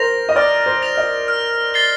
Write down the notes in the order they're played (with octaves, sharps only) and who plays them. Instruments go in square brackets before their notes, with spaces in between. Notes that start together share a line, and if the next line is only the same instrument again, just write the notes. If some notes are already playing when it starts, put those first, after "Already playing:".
Already playing: [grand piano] A#4 C5 [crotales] A#6 F7
[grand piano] D#5
[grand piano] D5 [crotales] F6
[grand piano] C5
[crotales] A#6 F7
[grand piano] D#5
[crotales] F6
A6 C7 G7